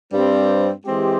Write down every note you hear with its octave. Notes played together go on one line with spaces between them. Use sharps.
G2 G3 C4
E3 G#3 C4 G4